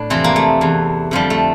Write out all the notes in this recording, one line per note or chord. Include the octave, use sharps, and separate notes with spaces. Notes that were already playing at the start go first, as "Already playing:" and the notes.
Already playing: A2 D4
F2 C3 E3 C4
A#3
A3
E2 E3
F2 D3 F3 G3
A3